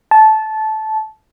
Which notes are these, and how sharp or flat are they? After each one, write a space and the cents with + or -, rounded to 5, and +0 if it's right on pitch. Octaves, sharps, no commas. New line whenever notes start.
A5 -15